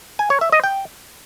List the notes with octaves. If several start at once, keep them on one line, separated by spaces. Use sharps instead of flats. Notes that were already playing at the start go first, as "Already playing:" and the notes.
G#5
C#5
E5
D#5
G5